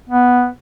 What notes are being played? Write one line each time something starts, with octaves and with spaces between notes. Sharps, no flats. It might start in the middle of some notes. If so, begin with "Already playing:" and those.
B3